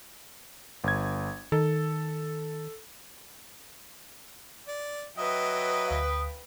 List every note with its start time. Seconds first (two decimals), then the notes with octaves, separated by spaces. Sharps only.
0.84 G1 G#6
1.52 D#3 A4
4.68 D5
5.18 F#3 B4 D#5 E5 G5 D#6
5.88 D2 F5